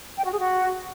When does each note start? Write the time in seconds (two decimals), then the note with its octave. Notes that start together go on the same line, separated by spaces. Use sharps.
0.17 G5
0.24 F#4
0.31 G#4
0.38 F#4